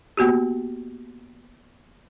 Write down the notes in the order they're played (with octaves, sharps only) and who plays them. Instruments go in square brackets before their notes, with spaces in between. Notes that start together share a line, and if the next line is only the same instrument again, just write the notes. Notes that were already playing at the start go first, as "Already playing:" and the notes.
[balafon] A#3 B3 F#4 G4